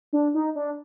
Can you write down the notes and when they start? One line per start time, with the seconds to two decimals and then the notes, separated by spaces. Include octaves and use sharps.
0.13 D4
0.34 D#4
0.55 D4